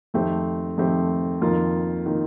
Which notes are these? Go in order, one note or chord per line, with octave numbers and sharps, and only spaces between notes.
F2 D#3 A3 C4 G4
F2 D#3 A3 C4 G4
F2 D#3 A#3 F4
D#3 A#3 F4